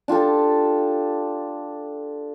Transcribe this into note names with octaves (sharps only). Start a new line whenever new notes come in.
D4 F4 G4 A4